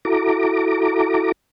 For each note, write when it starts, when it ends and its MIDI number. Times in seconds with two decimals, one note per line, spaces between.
0.05 1.32 64
0.05 1.32 66
0.05 1.32 69
0.05 1.32 82
0.05 1.32 86